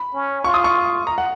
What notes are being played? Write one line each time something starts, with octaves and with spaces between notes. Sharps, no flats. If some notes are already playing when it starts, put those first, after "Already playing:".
Already playing: B5
C#4
F4 C#6
D#6
C#6
A#5
F#5